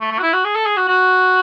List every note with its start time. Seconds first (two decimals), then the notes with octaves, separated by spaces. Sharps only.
0.01 A3
0.11 A3
0.19 F#4
0.22 E4
0.33 F#4
0.44 G#4
0.55 A4
0.66 G#4
0.77 F#4
0.88 F#4